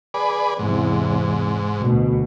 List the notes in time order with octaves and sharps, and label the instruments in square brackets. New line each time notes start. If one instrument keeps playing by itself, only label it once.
[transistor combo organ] G#4 B4 D5
[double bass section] E2 C3 E3 [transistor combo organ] G#2
[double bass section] D2 B2